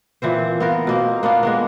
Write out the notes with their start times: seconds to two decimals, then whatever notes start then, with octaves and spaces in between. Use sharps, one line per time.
0.22 A#2 E3 C4 C5
0.60 B3 F4 A#4
0.87 B2 A#3 C4
1.23 A#3 B3 D4 F4
1.43 G#3 A#3 B3